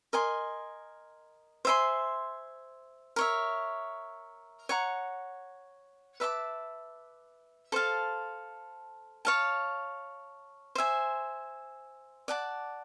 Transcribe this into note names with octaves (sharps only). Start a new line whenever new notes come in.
A#4 D#5 G#5 C6
C5 E5 G#5 C6
A#4 C#5 E5
C#5 F#5 A#5
B4 E5 A5 D6
A4 C5 F5 A5
C#5 F5 A5
C5 E5 G#5
D5 F#5 A5